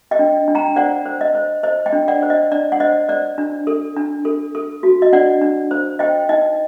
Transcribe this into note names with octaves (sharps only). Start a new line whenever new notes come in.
D#5 G5
D4
D4
G5 A#5
C5 D5 F#5
C5
D#5
C5
C5 D#5
D#5 G5
D4
D5 F#5
C5
D#5
D4 D5
F#5
C5 D#5
C5 D5
D4
A4
D4
A4
A4
F#4
D#5
D4 D5 F#5
D4
C5
C5 D#5 G5
D#4 D#5